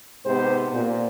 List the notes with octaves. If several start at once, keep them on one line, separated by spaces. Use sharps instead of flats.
G#2 C3 B3 G4 C5
A#2